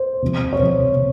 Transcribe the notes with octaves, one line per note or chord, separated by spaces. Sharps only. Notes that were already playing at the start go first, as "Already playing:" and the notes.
Already playing: C5
C3 F3
C#5
C3 F3 C5
C3